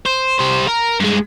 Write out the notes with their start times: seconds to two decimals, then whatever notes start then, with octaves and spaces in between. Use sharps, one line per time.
0.05 C5
0.38 G3 C5
0.67 A#4
1.00 G2 G#3